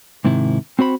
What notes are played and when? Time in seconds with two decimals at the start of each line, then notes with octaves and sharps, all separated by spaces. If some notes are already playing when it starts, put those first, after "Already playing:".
0.25 G#2 C3 D#3 E4
0.79 C4 F#4 C5 B5